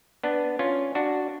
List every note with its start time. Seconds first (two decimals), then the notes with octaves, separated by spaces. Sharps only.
0.24 B3 D4
0.59 C#4 F4
0.95 D4 F#4